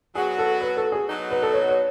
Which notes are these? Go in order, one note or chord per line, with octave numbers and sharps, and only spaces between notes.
F#3 B3 F#4 G#4
A4
B4
A4
G#4
F#3 B3 D#4 F#4
B4
A4
C#5
C#5